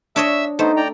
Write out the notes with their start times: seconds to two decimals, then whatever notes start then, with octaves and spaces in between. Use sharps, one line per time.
0.16 D4 C#5 D#5 E5 E6
0.59 A3 B3 D#4 C5
0.77 D5 G5 A#5